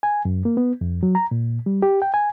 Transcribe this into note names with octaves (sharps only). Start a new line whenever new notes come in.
G#5
F#2
A#3
B3
F2
F#3
A#5
A#2
G3
G4
G5
G#5